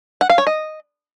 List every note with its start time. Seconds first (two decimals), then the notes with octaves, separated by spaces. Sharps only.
0.21 F#5
0.30 F5
0.38 C#5
0.47 D#5